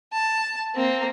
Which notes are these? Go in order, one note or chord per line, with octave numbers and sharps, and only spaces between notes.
A5
A#3 C4